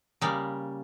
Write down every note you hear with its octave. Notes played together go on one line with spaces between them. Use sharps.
C#3 G3 A#3